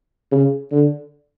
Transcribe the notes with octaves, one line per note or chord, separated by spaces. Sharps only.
C#3
D3